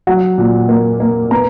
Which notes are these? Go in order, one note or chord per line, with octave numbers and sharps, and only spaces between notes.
F#3 F#5
A#2
A#3
A#3
B3 A#5